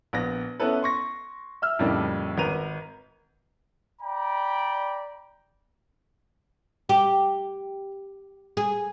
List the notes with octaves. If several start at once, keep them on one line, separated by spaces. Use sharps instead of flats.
A#1 B3 A#6
B3 C#4 E4 A4 B4
C6 C#6 A#6
E5 E6 F6
F2 A2 C#3 G3 A#3 D4
G#1 A#4 B4 A#5 D#7 F7
D5 G5 A#5 B5
G4
G#4